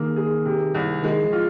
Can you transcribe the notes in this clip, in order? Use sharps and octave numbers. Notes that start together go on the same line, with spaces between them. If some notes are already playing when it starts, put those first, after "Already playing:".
Already playing: D#3 A#3 G#4
G#4
C3
C2
D#3 G#3
F3
F4